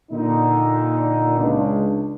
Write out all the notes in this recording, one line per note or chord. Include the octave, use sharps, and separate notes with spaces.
A#2 D3 D#4
C#2 D4